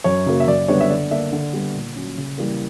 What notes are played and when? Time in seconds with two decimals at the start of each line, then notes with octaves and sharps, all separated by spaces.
0.04 F#2 C#5
0.26 C#3 F#3 A#3
0.40 E5
0.47 F#2 D5
0.68 D3 G3 B3 D4 C#5
0.81 E5
0.90 D3 D5
1.11 A#3 D4 E5
1.32 D3
1.53 G3 B3
1.74 A#2
1.96 F#3 C#4
2.17 C#3
2.38 E3 G3 A#3